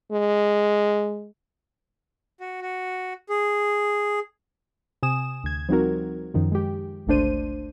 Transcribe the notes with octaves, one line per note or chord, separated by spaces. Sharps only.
G#3
F#4
F#4
G#4
C3 G#5 D#6 E7
D2 G#6
F3 G3 C4 D#4 F#4 A#4
F#2 D#3 F3
G#3 G4
G1 C#2 A3 D4 C5 D#7